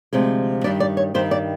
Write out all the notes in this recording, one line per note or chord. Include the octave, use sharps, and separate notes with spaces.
D2 C3 F3 G#3
G2 D#3 G3 D5
D5
C#5
G2 D#3 G3 C5
D5